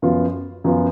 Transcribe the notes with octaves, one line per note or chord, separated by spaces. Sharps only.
F#2 F3 B3 F4
F#2 F3 B3 F4